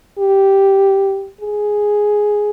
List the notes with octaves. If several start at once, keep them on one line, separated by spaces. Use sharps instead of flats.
G4
G#4